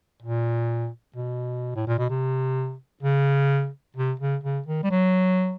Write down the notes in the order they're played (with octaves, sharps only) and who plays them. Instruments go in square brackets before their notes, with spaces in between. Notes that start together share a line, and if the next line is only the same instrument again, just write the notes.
[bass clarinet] A#2
B2
A2
A#2
B2
C3
C#3
C3
C#3
C#3
D#3
G3
F#3